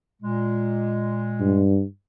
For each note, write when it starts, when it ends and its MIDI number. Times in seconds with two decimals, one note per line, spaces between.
0.22 1.77 46
0.22 1.77 56
1.40 1.84 43